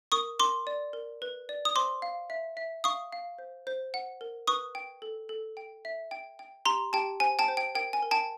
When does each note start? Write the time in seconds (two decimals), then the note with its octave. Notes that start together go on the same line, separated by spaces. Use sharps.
0.12 A#4 C#6 D#6
0.39 A#4 C6 D6
0.67 D5
0.93 A#4
1.22 B4
1.49 D5
1.65 D#6
1.76 C5 C6 D6
2.02 F5
2.30 E5
2.57 E5
2.84 F5 C#6 D#6
3.12 F5
3.39 C5
3.67 C5
3.94 F#5
4.21 A#4
4.47 B4 C#6 D#6
4.75 G5
5.02 A4
5.29 A4
5.57 G5
5.85 E5
6.11 G5
6.39 G5
6.65 G4 A#5 C6
6.93 G4 G5 A5
7.20 C5 G#5
7.39 G5 A5
7.48 C5
7.57 G5
7.75 A#4 G5
7.93 G#5
8.03 A#4
8.11 G5 A5